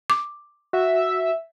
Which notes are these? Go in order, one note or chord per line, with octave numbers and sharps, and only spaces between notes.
D6
F#4 E5